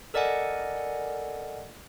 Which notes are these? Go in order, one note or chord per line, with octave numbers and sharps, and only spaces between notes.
A4 A#4 D5 D#5 F#5 G#5